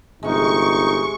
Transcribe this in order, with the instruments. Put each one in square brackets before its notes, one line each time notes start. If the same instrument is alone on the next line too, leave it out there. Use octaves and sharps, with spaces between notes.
[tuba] G1 [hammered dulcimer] C3 G#3 [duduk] D#4 [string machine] C#6